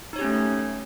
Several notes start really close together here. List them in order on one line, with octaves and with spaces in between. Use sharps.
D#4 C#5 G4 C#4 A3